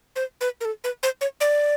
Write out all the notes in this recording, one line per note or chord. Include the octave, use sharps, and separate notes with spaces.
C5
B4
A#4
A4
B4
C5
C#5
D5